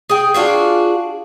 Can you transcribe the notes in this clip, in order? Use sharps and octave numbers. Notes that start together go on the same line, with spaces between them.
G#4 G5
D4 F4 F#4 G#4